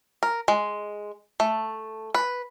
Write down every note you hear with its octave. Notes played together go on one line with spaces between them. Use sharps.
A#4
G#3
A3
B4